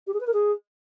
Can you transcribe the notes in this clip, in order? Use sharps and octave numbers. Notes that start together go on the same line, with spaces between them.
G4
G#4
B4
A#4
G#4